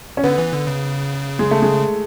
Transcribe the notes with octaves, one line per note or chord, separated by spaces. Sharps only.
C#4
D3 B3
E3
D3
C#3
G#3
A3
G#3